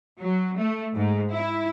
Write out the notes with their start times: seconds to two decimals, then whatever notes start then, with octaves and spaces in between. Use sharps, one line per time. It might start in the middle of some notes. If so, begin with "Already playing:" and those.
0.19 F#3
0.58 A3
0.93 G#2
1.30 E4